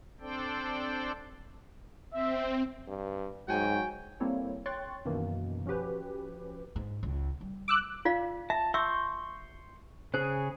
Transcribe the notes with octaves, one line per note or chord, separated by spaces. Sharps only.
C4 D4 A4 C5 D5 G5
C4 E5
G2
G#2 F#3 F#4 G5 G#5
G3 A#3 C4 E4 A4 C#5
C#5 G5 C6 C#6 F#6 A6
F#2 B2 D#3 E3 A#3
F3 C#4 F#4 G4 B4
G#2
C#2
G3
D6 E6 F#6
F4 D5 F5
E5 A5
E5 C6 C#6 E6 G6
C#3 G#4 C5